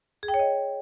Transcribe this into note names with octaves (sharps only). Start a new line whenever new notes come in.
G#4
G5
C#5
D#5